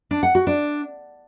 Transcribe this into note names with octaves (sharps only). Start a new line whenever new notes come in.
D4
F#5
F#4
D4